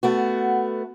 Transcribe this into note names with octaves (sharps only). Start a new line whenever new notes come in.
A3 B3 F#4